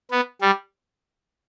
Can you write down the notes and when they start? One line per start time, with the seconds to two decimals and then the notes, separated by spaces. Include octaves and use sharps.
0.11 B3
0.41 G3